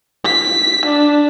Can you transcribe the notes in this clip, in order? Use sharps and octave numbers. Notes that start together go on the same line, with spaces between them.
B6
D4